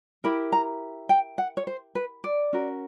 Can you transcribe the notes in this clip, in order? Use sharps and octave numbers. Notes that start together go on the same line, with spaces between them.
E4 G4 A#4 B5
A#5
G5
F#5
C#5
C5
B4
D5
C#4 F#4 A#4